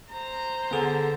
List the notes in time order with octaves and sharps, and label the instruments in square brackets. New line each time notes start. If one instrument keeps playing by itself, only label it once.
[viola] C5 A#5
[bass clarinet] D3 [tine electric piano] B3 G#4 A4